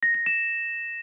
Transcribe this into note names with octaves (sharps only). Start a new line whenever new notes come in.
A#6
A#6
E7